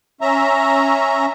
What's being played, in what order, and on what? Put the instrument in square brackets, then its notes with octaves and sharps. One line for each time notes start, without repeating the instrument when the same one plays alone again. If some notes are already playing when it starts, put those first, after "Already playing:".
[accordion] C#4 E5 A#5